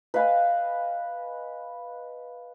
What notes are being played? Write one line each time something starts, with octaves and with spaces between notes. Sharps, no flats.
B4 D#5 F5 G#5